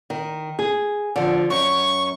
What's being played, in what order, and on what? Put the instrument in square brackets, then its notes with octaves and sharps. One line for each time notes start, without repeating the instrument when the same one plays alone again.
[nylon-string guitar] D#3
G#4
D3 F3
[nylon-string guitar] F#2 [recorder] C#6